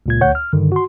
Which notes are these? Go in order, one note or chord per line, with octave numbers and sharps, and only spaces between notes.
C#2 A#2 G#6
D2 C#5 F#5 G6
F6
G2 D3 D#3
F#4 C6